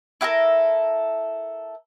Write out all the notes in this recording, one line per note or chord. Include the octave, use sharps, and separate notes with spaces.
E4 G4 A4 A#4